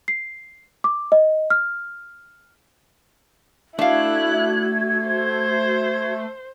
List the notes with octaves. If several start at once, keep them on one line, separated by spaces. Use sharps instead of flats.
C7
D6
D#5
F6
A3 D4 E4 F#4 F5 F#6 G#6
C5